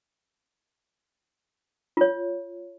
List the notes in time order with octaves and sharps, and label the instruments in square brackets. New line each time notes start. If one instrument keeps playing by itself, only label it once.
[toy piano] F4 C#5